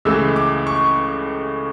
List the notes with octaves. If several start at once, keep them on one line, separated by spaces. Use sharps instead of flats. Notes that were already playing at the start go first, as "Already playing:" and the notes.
C#2 C#3 E3 A3 E6
D6
C#6